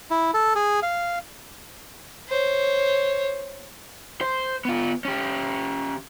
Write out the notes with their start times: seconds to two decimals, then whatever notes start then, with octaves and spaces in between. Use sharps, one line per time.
0.11 E4
0.34 A4
0.56 G#4
0.83 F5
2.29 C5 C#5
4.21 C5
4.65 B3 F4
5.05 C#4 G4